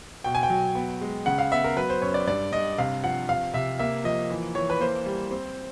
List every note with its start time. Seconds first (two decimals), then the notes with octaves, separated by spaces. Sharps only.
0.24 B2 G5
0.35 G#5
0.43 G5
0.50 F#3
0.75 B3
1.01 G#3
1.26 C#3 F#5
1.38 F5
1.52 B3 E5
1.64 A#4
1.77 F#3 B4
1.90 C5
2.02 F#2 C#5
2.14 D5
2.27 G2 D5
2.52 G2 D#5
2.78 C3 F5
3.03 F3 F#5
3.28 C3 F5
3.53 C3 E5
3.79 A#3 E5
4.04 F3 D#5
4.30 E3
4.55 E3 C#5
4.70 B4
4.81 A#3 C5
5.06 G3
5.31 C4